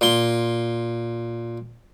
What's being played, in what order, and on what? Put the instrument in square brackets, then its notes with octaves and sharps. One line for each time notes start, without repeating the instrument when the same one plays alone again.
[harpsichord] A#2 C6